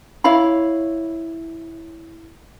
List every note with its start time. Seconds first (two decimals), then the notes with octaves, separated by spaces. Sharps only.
0.24 E4 C#5 F5 B5